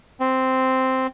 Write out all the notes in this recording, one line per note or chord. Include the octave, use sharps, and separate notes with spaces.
C4